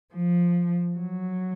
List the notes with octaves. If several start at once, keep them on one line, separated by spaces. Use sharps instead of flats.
F3
F#3